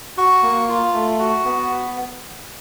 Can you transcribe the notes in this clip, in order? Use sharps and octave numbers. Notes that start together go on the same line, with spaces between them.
F#4 C#6
A#3
F4
A3
F#4
B3